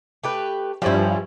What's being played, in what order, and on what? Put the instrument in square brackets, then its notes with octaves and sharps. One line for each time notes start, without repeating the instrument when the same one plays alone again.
[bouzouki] A3 G4 B4
[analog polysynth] G2 F3 [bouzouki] G3 C#4 E4